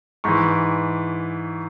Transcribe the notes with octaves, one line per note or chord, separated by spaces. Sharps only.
G#2 E3 C#6